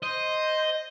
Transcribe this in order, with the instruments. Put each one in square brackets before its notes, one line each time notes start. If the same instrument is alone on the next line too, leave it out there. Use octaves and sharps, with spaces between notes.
[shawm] C5 [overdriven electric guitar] D#5